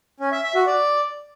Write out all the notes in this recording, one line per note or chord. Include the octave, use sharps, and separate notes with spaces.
C#4
E5
E5
F#4
D5